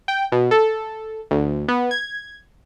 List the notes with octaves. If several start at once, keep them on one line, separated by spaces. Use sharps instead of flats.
G5
B2
A4
D2
B3
G#6